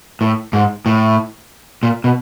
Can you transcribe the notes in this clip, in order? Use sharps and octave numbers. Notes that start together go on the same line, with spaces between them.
A2
G#2
A2
A#2
B2